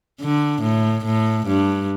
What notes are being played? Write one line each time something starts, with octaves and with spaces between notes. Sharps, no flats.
D3
A2
A2
G2